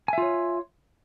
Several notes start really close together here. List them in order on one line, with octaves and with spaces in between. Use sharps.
G#5 E5 F4 C#5